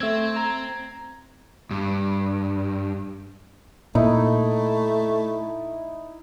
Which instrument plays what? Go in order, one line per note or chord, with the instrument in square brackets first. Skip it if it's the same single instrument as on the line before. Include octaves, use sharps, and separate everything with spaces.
[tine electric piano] A3 E6 G#6 [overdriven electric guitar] C4
[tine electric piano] A#5 G#6
[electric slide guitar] G2
[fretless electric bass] A#2 [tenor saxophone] A3 [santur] D#4 E4